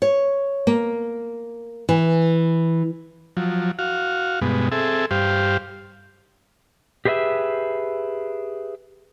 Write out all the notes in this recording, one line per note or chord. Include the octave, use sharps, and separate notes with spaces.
C#5
A#3
E3
F3 F#3
F#4 F5
G2 B2 G#3 B3
C4 G#4 A4 E5
G2 G4 C5 F5
G4 G#4 B4 D#5 E5